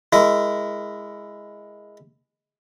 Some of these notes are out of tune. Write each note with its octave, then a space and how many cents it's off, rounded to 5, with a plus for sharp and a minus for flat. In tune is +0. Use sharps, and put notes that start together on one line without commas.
G#3 +0 E4 +10 A#4 +0